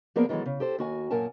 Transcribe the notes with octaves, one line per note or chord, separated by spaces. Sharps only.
F3 A#3 B3 G#4 A#4 D5
D#3 E3 F#3 G#3 A4
C#3
G4 A4 C5
D#2 F#4 G#5
F#2 A#2 A#4 F#5 G#5 A5